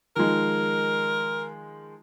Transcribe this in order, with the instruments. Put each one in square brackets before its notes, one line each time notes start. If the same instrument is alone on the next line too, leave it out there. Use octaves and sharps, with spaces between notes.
[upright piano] D#3 F3 G#3 [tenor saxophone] A#4